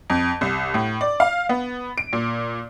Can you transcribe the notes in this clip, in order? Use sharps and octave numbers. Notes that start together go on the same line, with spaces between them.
F2
C2
A2
D5
F5
B3
D7
A#2